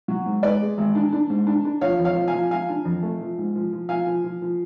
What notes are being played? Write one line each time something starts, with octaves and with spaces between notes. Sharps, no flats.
F#3
G#2
G#2 B4 D5
G#3
G#1
D4
D4
G#2
D4
D4
F3 C#5 F5
F2
C#5 F5
F3
F5 G#5
F3
F3 F5 G#5
D4
F2
A3
F3
G#2
F3
F3
F3 F5 G#5
F3
F3
F3